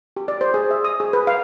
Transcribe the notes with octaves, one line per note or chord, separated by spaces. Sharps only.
G4
D5
C5
G#4
E5
D#6
G#4
B4
F5